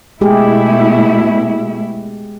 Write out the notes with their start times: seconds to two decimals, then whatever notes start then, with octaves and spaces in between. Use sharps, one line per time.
0.21 B2 G#3 A3 E4 G4 G#4